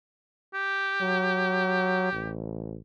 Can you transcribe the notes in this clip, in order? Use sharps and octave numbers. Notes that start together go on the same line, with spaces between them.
G4
F#3
A1